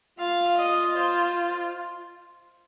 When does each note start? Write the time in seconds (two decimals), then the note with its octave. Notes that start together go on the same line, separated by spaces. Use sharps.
0.19 F4 F5
0.57 D#5
0.96 C5